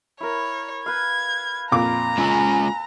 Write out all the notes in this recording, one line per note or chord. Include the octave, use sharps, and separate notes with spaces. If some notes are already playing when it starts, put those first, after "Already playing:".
E4 A#4 C#5
B4 F5 G#6
F2 A#2 A#5 D6
G#3 C#4 F4 G#5 B5 E6